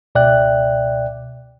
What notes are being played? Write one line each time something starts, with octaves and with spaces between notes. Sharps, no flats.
C#2 B2 D5 E5 G5 F#6